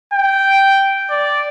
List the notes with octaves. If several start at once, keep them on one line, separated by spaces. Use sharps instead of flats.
G5
D5